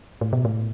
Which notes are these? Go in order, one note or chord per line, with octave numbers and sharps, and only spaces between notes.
A2
B2
A2